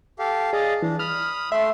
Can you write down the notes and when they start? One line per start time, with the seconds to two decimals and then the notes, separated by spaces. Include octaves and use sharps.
0.19 G4 A4 F5
0.53 G#4 D5 D#5 F5
0.82 E3 D4
0.99 B5 D#6 F6
1.52 A3 E5 C6